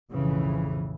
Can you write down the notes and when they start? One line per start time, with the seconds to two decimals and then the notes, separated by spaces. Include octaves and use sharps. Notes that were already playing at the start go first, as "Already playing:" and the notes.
0.12 B1 F2 A2 C#3 E3